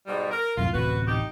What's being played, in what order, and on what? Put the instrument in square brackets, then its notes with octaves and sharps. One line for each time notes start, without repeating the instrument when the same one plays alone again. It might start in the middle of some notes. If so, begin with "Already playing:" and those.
[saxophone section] G#2 B2 G3
A#4
[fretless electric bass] B1 F2 A2 [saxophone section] F4
[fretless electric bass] D1 A1 C3 [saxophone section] F#4 B4
[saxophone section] D#4 G4